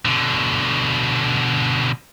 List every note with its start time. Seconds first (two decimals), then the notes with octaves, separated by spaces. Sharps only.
0.05 B2 D3